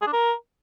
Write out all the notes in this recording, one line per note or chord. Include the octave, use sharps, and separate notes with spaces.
G#4
D4
A#4